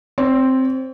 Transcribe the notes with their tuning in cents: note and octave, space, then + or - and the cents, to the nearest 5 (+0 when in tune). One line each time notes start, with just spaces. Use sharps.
C4 +0 C#5 +40